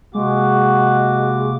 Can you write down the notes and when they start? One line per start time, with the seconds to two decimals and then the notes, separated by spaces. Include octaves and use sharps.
0.14 C3 G#3 A#3 F#4 D6